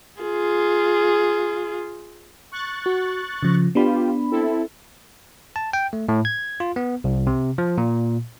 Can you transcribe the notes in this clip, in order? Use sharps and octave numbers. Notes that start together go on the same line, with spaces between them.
F4 G#4
C#6 F#6 A6
F#4
C#3 F3
B3 D4 F4 G4 B5
C4 E4 A4
A5
G5
A3
A2
G#6
F4
B3
C2
C3
F3
A#2